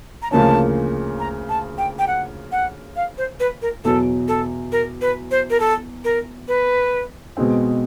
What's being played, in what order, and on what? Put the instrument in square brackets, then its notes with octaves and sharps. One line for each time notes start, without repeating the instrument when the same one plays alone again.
[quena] A#5
[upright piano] D2 C#3 F3 A#3 C#4 [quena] A5
[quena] A#5
A5
G5
G5
F#5
F#5
F5
C5
B4
A#4
[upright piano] E2 B2 F#3 [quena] A4
[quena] A4
A#4
B4
C5
A#4
A4
A#4
B4
[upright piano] B2 G#3 C4